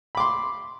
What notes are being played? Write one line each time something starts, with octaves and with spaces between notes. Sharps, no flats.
B5 C6 D6